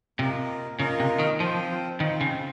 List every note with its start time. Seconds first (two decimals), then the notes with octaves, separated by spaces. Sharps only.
0.19 C3 A#3 F4 A#4 D#5
0.79 C#3 A#3 F4 A#4 D#5
1.00 C3
1.19 D#3
1.40 F3 C4 F4 C5 G5
2.00 D#3 C4 F4 C5 G5
2.21 C#3